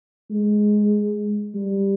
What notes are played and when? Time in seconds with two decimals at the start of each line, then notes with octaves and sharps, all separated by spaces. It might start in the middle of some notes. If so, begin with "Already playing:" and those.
0.30 G#3
1.55 G3